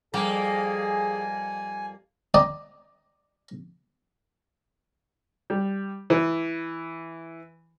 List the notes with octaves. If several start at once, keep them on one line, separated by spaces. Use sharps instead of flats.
F2 G3 A#3 G#4 G#5
D5 D#5 G5 A#5
G3
E3